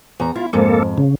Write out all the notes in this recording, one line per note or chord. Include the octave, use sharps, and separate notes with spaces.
E2 A#5
E4 F4
F2 G#2 A#3 A4
C#3